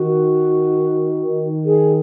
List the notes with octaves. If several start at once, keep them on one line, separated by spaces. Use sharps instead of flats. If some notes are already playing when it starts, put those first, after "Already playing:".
Already playing: D#3 F#4
G#4